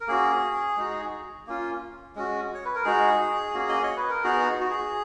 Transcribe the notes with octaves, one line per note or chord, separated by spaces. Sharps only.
A#4
A#3 C#4 F#4 G#4
G#3 D#4 F#4
A#3 C#4 F4
G#3 C#4 F#4
C#5
B4
A#4
G#3 D#4 F#4 G#4
A#3 C#4 F#4
D#5
C#5
B4
A#4
B3 D#4 F#4 G#4
F#4
G#4